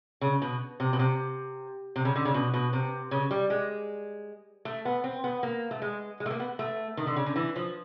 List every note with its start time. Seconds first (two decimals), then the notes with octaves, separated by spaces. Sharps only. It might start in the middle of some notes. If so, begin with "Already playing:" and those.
0.21 C#3
0.42 B2
0.80 C3
0.93 B2
0.99 C3
1.96 C3
2.05 C#3
2.16 D3
2.25 C#3
2.34 B2
2.54 B2
2.73 C3
3.11 C#3
3.31 G3
3.50 G#3
4.65 A3
4.85 B3
5.04 C4
5.24 B3
5.43 A#3
5.71 A3
5.82 G#3
6.20 G#3
6.26 A3
6.30 A#3
6.40 B3
6.59 A3
6.97 D#3
7.07 D3
7.16 C#3
7.26 D3
7.36 E3
7.56 F3